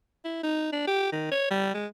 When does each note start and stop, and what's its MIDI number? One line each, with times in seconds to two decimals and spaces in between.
0.25 0.43 64
0.43 0.71 63
0.72 0.85 62
0.87 1.10 67
1.12 1.28 51
1.32 1.49 73
1.51 1.74 55
1.74 1.86 56